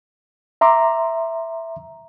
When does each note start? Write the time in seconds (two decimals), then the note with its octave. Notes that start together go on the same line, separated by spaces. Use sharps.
0.61 E5 A#5 C6 D6